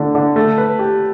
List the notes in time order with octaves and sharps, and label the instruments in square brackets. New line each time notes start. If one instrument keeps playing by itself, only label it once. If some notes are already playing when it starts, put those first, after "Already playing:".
Already playing: [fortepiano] D3 A3
D3
A3
B4
G4